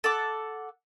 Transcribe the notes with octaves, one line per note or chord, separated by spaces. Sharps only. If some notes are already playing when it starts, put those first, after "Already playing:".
A4 F#5 D6